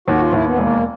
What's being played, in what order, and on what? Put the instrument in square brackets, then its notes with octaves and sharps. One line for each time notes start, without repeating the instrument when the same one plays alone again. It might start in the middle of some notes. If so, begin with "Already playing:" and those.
[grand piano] D#2 [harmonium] F#4
[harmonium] F4
[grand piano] D#2 [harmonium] E4
[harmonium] B3
[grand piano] E1 [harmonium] A#3